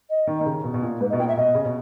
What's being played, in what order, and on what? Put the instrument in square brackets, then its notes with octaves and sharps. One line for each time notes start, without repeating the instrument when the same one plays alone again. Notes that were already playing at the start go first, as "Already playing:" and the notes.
[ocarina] D#5
[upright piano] D#3
D#3
C#3
B2
B2
A#2
[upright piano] G#2 [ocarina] B4
[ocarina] D#5
[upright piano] B2
[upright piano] A#2 [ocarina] G5
[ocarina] E5
[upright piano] B2 [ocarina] D#5
[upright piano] C#3
B2